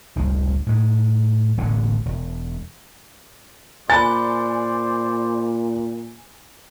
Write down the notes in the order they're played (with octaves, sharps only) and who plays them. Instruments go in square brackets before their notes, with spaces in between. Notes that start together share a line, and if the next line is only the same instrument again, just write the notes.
[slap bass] F1 C#2 G2 F3
A2 G#3
E1 A1 A2 D3
E1
[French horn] A#2 [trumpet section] C5 D5 [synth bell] G#5 [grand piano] B5 A6